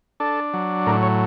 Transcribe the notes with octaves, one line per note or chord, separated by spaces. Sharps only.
D4 A4
F#3
A2 A#4
C#5